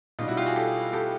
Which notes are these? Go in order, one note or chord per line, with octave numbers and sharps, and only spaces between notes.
B2 G3 D#4 F4
E4 F#4
F4 G4
F#4 G#4
G4 A4
G4 A4